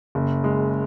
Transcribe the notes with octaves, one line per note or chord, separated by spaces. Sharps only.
F#1
G#3